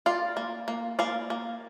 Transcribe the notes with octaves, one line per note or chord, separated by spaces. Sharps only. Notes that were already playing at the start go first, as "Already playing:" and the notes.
F4 D5 F5
A#3
A#3
A#3 D5 F5
A#3